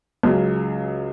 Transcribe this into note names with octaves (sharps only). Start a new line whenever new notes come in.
C#2 C#3 F#3